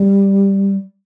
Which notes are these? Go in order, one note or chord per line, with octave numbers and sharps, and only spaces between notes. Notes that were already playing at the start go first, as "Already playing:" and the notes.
Already playing: G3